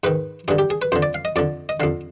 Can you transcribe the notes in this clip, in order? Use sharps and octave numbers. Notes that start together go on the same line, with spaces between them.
G#2 D#3 B4
G2 D3 G#4
G4
G#4
B4
F2 D3 C5
D5
F5
D#5
F2 D3 D5
D#5
F2 D3 F5